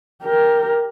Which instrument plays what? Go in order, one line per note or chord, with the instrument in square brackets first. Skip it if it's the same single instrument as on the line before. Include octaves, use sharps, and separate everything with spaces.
[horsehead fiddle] G4 A#4